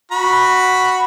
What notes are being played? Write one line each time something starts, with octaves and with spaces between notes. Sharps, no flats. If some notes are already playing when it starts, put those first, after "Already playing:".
F#4 B5